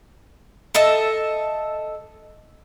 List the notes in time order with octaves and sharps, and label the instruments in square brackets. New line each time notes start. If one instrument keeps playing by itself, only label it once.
[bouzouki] A4 D#5 E5 A5